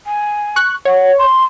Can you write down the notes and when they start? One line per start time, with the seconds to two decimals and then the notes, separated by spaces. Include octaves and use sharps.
0.05 G#5
0.56 C#6 F#6
0.85 C#5 F#5
1.18 C6